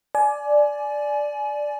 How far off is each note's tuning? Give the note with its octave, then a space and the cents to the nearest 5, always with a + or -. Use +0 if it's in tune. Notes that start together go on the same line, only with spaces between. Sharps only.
D5 +0 G#5 +25